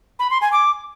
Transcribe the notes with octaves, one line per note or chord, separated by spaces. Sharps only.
B5
C6
G#5
D6